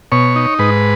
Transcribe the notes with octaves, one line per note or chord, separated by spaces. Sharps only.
B2 C#5
D#4
G#2 B4